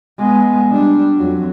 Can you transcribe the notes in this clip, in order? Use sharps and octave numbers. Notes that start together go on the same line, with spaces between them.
G#3 B3
G3 D4
F2 F#3